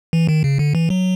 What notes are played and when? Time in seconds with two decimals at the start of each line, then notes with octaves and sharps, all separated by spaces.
0.13 E3
0.29 D#3
0.44 C#3
0.59 D3
0.75 E3
0.90 F#3